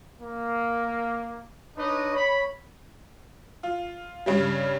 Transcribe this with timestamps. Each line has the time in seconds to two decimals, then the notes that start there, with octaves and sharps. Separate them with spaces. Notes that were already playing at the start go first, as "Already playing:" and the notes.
0.21 A#3
1.77 D4 D#4 B4 C#5 D#5
2.14 C#5 B5
3.63 F4
4.26 G2 C#3 G3